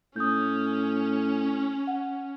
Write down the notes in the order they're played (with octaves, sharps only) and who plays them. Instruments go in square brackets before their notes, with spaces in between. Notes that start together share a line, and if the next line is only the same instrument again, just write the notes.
[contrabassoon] A2 [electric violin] C#4 [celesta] D#6 G6
[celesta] F#5